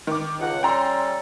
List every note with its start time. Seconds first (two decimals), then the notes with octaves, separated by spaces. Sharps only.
0.07 D#3 D6
0.40 C#2 F#5
0.63 G3 C#4 A4 G5 A#5 C6